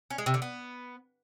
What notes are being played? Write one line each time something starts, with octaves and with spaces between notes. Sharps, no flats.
C#4
G#3
C3
D3
B3